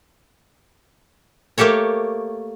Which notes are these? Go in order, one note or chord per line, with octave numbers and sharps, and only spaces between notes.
A3 A#3 G4 A4 C#5